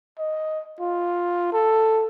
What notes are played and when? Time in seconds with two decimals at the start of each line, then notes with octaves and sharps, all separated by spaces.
0.19 D#5
0.80 F4
1.52 A4